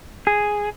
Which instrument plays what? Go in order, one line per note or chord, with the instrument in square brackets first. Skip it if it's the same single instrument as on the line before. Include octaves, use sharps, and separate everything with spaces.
[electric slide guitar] G#4